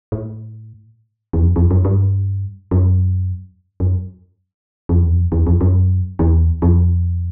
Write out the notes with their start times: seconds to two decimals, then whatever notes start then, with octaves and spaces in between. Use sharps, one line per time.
0.12 A2
1.33 E2
1.42 F2
1.56 F2
1.71 F#2
1.85 G2
2.71 F#2
3.80 F#2
4.89 F2
5.03 E2
5.10 F2
5.32 E2
5.47 F2
5.61 F#2
6.19 E2
6.62 F2